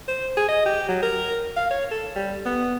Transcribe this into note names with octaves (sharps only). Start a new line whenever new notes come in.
C5
G#4
D#5
G4
F#3
A#4
F5
C#5
A4
G3
B3